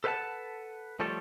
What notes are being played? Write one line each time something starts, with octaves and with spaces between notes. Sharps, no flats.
A4 B4 C5 F5 F#5 A5
F3 G3 A3 A4 C#5